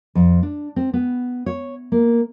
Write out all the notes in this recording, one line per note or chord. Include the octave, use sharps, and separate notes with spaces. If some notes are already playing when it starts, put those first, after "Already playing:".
F2
D4
C4
B3
C#5
A#3